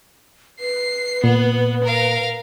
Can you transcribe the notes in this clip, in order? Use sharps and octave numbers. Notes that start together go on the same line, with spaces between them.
B4 C7
A#2 B3
A#4 F5